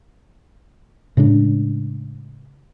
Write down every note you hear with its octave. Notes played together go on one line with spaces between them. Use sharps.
A2 C#3 G#3 D4